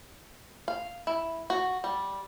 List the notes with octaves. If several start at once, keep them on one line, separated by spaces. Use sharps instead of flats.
F5
E4
F#4
G3